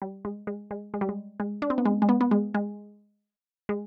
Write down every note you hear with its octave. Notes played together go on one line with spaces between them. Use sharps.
G3
G#3
G#3
G#3
G#3
G3
G#3
G#3
D4
C4
B3
G#3
G#3
B3
B3
G#3
G#3
G#3